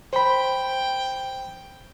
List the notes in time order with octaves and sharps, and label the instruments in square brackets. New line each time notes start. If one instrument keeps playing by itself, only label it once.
[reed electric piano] C5 B5 [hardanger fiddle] G5